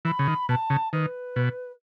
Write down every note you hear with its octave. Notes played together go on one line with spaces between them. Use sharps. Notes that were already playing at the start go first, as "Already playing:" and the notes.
E3 B5
C#3
D#3
B2 A5
C#3
D#3 B4
B2